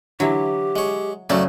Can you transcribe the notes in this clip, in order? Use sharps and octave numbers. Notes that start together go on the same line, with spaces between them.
D3 E3 F#3 E4 G4
G#3 C#5
F#2 C#3 F#3 A3 D5